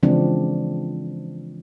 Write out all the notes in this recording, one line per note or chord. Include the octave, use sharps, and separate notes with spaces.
C#3 E3 F3 G#3 C4 D4